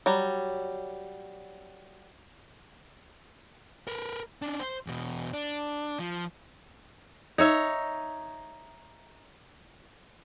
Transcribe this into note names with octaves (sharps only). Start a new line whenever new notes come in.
F#3 G3
A#4 B4
C#4 D4
C5
E2 B2
D4
F3
D#4 C#5 E5